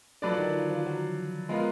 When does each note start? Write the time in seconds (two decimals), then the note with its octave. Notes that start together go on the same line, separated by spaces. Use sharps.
0.22 D3 F#3 D4 F4 B4 D5
0.38 D#3
0.53 F3
0.70 F3
0.86 F#3
1.49 F3 G#3 B3 F4 A#4